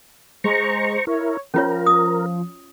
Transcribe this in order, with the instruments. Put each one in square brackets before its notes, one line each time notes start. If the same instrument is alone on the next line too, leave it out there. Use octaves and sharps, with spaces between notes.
[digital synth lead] G#3 [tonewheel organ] C5 A#5 C#6
[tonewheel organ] E4 A#4 [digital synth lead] C#5
[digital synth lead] F3 [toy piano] C#4 F4 C#5 [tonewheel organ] A#4
[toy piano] D#6